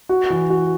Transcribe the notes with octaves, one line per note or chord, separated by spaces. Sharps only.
F#4
E3
F#4